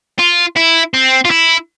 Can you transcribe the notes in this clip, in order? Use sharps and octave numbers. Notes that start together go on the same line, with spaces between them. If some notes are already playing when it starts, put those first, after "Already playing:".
F4
E4
C4
F4
E4